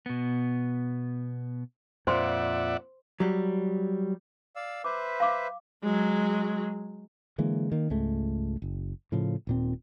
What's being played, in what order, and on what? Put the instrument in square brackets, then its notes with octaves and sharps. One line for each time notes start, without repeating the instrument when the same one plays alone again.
[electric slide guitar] B2 B3
[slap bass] F2 A#2 [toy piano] C5 C6 [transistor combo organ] D5 E5 F#5
[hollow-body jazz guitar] F#3 G3
[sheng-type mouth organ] D5 F5 E6
[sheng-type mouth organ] B4 C5 E5 [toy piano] D6
[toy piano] F5 D6
[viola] F#3 G#3
[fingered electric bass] D3 E3 G#3 A#3
D#3 A#3
C#2 G#2 G#3 A3
F#1
A2 C#3 F3
D#1 A#2 C4